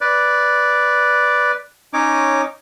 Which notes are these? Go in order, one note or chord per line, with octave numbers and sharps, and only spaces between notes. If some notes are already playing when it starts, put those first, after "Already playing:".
B4 D5
C#4 D#4 C#5 D6